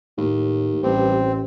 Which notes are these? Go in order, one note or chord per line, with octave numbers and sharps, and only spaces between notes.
D#2 A2
A1 G2 C4